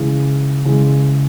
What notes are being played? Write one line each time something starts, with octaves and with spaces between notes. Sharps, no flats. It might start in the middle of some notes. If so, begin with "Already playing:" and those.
Already playing: C#3 E3 G#3
C#3 E3 G#3